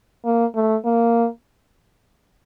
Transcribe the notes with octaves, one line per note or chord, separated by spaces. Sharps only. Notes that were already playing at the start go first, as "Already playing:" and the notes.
A#3
A3
A#3